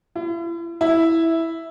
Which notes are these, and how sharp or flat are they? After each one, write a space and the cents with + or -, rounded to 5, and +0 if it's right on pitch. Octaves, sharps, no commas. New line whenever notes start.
E4 +40
E4 -5